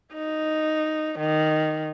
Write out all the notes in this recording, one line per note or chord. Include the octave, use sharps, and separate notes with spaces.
D#4
D#3